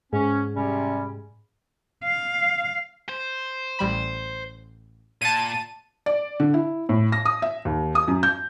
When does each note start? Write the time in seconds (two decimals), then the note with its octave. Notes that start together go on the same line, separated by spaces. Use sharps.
0.13 G#2 C#4
0.55 C3 G3 C#4
2.04 F5
3.09 C5
3.79 A1 G3 B5
5.22 A#2 A5 D#7
6.06 D5
6.40 D3
6.54 E4
6.89 A2
7.12 A#6
7.25 D#6
7.42 E5
7.65 D#2
7.95 D#6
8.08 F#2
8.23 G6